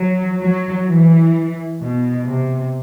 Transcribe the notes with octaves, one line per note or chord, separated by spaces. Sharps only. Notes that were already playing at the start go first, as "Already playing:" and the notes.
Already playing: F#3
F#3
E3
B2
C3